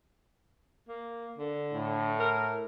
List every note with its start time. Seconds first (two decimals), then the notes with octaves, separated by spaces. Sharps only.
0.88 A#3
1.38 D3
1.73 A2
2.19 A#4